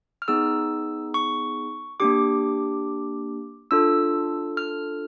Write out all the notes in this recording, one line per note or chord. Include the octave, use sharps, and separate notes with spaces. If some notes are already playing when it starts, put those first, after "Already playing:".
F6
B3 D#4 G#4 E6
C#6
A#3 D4 G4 D6
D4 F4 A4 E6
F6